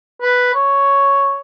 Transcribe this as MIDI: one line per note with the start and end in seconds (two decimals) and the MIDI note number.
0.22 0.51 71
0.55 1.38 73